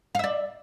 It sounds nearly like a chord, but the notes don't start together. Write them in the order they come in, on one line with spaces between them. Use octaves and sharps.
F5 E5 D5